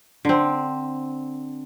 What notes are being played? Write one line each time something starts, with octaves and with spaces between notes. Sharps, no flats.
D3 C4